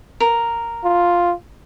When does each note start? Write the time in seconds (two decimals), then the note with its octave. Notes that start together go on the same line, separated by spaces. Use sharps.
0.20 A#4
0.84 F4